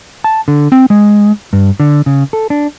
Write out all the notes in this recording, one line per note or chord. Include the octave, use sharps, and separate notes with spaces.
A5
D3
C4
G#3
G2
D3
C#3
A4
D4